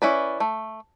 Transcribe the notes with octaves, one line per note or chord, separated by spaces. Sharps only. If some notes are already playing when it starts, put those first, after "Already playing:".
C#4 E4 B4 D5
A3